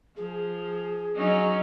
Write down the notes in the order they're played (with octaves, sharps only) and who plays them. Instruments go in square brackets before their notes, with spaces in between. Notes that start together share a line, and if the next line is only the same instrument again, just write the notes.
[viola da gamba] F3 [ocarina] G#4
[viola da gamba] F#3 C#4 D#4